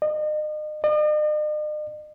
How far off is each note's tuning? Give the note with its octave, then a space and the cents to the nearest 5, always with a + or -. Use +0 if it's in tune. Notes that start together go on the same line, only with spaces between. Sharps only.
D#5 -35
D#5 -45